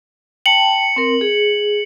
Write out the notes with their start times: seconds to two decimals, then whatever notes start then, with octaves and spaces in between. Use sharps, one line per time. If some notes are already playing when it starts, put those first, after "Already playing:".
0.46 G5 A5 C#7 F#7
0.96 C4 A#4
1.21 G#4